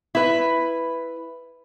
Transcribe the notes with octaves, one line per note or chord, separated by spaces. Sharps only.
E4 B4